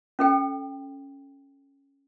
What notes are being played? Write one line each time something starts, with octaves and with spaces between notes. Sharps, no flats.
C#4 A4 G5